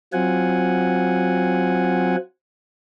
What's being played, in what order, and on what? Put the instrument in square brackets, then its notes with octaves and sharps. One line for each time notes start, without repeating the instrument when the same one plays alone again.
[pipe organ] F#3 C4 F4 F#5 G#5